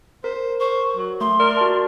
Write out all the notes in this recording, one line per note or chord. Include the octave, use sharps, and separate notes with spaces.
A#4 C5
C5 C#6
F#3
A3 C6
A#4 D5
F#4 A5